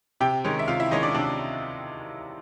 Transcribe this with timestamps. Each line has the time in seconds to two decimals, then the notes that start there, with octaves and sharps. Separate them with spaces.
0.20 C3 G4 G5
0.45 D#3 G#3 C#4
0.59 E5
0.68 C3 F4 F5
0.80 E4 E5
0.91 D#3 G#3 C#4 D#4 D#5
1.03 D4 D5
1.14 C3 D4 D5